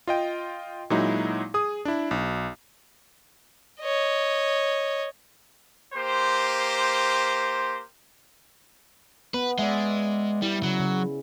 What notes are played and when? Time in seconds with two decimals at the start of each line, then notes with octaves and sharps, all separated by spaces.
0.07 F4 D#5 G5
0.90 A#2 F#3 G#3 D#4 E4
1.54 G#4 D#6
1.85 D4 E4
2.11 B1
3.82 C#5 D#5
5.94 A#3 G4 C5
9.34 B3 B4
9.59 G#3 D5 E5
10.42 G3 E4
10.63 C#3 F#3
10.80 C#3